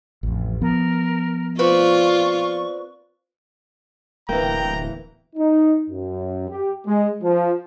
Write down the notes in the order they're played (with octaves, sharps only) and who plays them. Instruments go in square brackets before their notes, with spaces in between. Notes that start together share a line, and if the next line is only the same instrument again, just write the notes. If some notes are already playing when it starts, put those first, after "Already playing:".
[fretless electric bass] A1 F2
[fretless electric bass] F3 B3 [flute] A#4
[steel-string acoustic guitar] C4 B4 D5 [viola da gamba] F4 [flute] C#6
[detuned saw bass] D1 [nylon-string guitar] E3 A#3 [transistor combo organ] G5 [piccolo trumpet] A#5
[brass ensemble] D#4
F#2
G4
G#3
F3